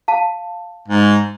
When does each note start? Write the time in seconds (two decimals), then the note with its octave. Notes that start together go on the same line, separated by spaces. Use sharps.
0.08 F5 A5
0.88 G#2